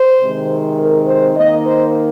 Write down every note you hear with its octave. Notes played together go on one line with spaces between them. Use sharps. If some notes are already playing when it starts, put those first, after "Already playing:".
Already playing: C5
C3 D#3 G#3 C4
A#4
C5
D#3 A#3 D#5
C5